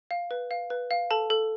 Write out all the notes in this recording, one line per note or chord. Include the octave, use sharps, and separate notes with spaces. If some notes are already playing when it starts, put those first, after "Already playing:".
F5
B4
F5
B4
F5
A4 A5
A4